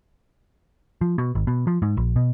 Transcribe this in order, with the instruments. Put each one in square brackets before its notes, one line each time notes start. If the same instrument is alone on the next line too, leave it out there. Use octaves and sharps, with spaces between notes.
[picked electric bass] F3
B2
G#1
B2
F3
G#2
A#1
B2